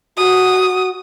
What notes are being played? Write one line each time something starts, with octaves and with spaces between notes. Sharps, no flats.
F#4 D#6